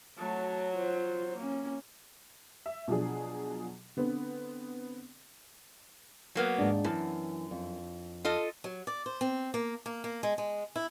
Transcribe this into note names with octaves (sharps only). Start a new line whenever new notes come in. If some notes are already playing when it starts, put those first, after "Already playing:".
F#3 A3 A5
F4 C5
A#3 C#4
E5
B2 F3 F#3 D4 G#4
D3 B3 C4
F#3 A#3 B3
D#2 G#2 D4
F#2 E3 B3 A5
F2
F4 A4 D#5
F#3
D5
C5
C4
A#3
A#3
A#3
G#3
G#3
E4